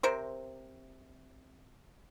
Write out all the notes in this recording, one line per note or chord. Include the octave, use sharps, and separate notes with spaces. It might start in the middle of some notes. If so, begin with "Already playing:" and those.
C3 A#4 C5